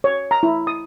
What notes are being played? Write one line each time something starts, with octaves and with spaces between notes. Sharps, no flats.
C#5
A#5
E4
D#6